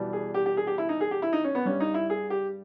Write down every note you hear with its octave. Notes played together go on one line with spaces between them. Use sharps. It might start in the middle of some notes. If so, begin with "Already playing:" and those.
Already playing: E2 B2 G3
G#4
G4
G4
G#4
G4
E4
D#4
G#4
G4
E4
D#4
C#4
B3
G2 G3 C#4
D#4
E4
G#4
G4